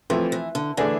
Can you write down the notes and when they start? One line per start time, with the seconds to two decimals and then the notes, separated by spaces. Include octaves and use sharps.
0.10 E3 F3 A3 C4
0.32 E3
0.55 D3
0.77 D3 E3 A3 D4 G#4